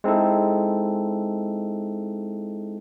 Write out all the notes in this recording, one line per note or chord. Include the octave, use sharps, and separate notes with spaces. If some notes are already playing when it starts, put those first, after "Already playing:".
G#3 C4 D#4 E4 A4